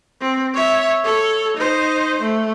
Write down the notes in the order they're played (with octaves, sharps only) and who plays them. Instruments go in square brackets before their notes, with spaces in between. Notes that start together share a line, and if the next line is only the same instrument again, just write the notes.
[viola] C4
C#5 E5
A4 C#5
D#4 C5
A3